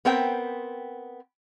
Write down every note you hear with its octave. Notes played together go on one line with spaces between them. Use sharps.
B3 C4 A#4 C5 G5